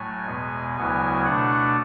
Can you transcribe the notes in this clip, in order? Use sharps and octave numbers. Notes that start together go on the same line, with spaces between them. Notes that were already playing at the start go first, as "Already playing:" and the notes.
Already playing: A2 F#3 A3 G#5
E2 B2 G#3 B3
D2 C#3 F#3 B3 E4 G#5
B2 A3 D4 F#5